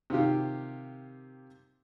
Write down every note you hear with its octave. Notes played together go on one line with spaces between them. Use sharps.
C3 D#3 F4 G4